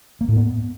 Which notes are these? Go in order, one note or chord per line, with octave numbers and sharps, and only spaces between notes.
A#3
A2
B3